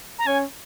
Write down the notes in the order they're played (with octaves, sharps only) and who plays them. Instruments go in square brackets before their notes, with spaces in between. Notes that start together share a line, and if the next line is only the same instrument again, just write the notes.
[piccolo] A#5
[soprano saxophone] C#4 [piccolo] G#5